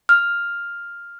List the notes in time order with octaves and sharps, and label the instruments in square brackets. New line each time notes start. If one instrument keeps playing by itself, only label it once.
[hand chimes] F6